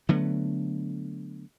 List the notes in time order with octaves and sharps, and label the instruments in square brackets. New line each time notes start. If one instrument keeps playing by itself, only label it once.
[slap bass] D3 F#3 A3 B3